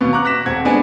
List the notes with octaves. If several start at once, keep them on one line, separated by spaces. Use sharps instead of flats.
D#2 B2 B3
A#5 C#6 D6 F#6
F#6 A#6 B6 E7
D#1 C4 F#5 G#6
G#3 B3 D4 G#5